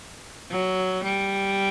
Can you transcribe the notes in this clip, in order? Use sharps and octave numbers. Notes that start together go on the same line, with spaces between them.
F#3
G3